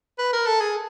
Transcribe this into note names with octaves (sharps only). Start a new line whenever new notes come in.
B4
A#4
A4
G#4